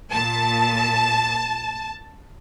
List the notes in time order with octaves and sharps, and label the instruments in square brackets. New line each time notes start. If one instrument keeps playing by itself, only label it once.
[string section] A#2 A5